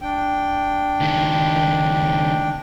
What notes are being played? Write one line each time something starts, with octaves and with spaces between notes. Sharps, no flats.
D4 G5
C#2 D#3